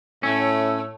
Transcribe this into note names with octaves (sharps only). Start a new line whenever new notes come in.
A2 A3 C#4 C#5 E6